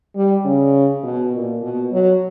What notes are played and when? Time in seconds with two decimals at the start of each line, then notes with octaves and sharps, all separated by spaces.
0.16 G3
0.45 C#3
1.04 B2
1.33 A#2
1.62 B2
1.92 F#3